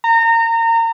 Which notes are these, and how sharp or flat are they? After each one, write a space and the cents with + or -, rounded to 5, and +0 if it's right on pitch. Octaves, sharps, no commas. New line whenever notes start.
A#5 -30